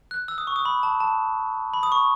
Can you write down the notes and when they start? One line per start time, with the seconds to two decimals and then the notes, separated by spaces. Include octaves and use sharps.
0.11 F#6
0.28 E6
0.38 D#6
0.47 C#6
0.56 D#6
0.65 B5
0.83 A5
1.00 A5
1.74 B5
1.83 D#6
1.92 C#6